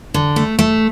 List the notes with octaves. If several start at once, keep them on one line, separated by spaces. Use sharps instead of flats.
D3
A3
A3